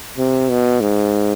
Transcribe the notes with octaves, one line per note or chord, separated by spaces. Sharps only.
C3
B2
G#2